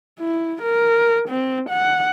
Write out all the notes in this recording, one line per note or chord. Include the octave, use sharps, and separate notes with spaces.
E4
A#4
C4
F#5